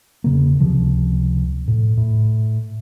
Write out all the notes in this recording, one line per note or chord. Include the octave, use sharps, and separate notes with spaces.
E1 C#3 A#3
C#2 C3 F3
A2
A2